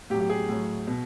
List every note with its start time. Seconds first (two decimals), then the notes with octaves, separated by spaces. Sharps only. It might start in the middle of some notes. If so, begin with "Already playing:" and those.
0.10 A2 G4
0.14 F#3
0.20 G4
0.30 G#4
0.49 A2 F#3
0.87 B2